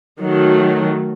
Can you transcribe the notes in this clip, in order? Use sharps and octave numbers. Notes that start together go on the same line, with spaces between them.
D#3 F#3 A3